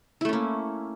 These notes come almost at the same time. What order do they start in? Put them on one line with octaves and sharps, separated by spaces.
E4 A3 C#4 A#3